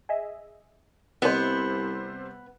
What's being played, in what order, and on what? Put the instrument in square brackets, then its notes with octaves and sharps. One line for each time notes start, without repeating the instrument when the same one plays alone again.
[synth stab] G#4 D#5 E5
[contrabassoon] C2 [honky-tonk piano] C3 G3 C5 [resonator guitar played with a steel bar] B3 [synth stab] D#5